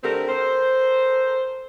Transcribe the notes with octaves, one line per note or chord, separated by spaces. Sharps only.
D3 A3 C4 G4 A#4
A4 A#4 C5